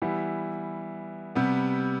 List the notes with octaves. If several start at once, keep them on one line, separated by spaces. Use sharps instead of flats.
E3 G3 B3 E4
C3 G3 B3